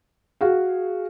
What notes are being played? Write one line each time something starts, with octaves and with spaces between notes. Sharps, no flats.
F#4 G#4 F5